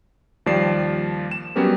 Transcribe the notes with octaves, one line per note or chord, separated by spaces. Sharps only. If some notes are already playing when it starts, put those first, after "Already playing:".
D#2 F3 G3 D5 C7 E7
E7
F#3 G3 B3 C#4 G4 A#4